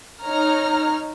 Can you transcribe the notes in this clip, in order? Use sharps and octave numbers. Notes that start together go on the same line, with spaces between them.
D#4 C#5 A#5 F6